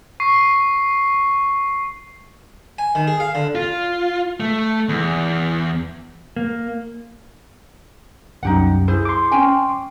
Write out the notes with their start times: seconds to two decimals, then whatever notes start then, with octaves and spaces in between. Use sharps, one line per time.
0.20 C#6 C7
2.79 G#5
2.95 D#3
3.08 G#4
3.20 F5
3.35 D3
3.55 F4
4.40 A3
4.89 E2
6.37 A#3
8.43 C2 F#2 D#4 G4 F#5
8.88 E4 G#4 C5
9.05 C6 D6
9.32 C#4 G5 G#5